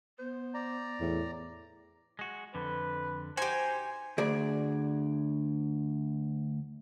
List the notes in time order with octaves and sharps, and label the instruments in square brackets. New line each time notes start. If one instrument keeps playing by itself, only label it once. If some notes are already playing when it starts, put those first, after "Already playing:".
[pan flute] B3 [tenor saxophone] C5
[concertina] D5 A#5
[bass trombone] E2 [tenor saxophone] A2
[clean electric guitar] G#3 F#4
[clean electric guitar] F2 D3 [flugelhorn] B4
[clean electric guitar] D#4 F#4 [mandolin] G4 G#5 [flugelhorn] C5
[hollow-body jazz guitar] D2 G#4 D5